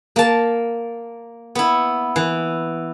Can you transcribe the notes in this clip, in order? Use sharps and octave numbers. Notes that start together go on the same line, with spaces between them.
A#3 A5
B3 E4
E3